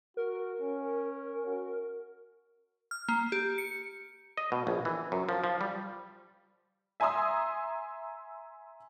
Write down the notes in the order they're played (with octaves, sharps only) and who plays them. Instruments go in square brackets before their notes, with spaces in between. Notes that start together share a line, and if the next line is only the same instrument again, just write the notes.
[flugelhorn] F#4 [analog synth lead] A#4
[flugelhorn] C#4
F#4
[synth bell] F6
A#3
G4
C#7
[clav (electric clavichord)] D#5
B2
A#1
E3
F#2
F3
F3
G3
[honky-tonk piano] E5 G#5 A#5 C6 D#6 E6